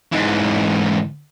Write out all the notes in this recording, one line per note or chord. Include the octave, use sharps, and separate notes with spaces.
G#2 E3